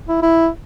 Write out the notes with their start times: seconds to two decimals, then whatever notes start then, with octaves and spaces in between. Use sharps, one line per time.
0.09 E4
0.22 E4